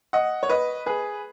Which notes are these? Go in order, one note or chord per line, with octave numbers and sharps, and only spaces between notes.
D#5 F#5
C#5
B4 D#5
G#4 B4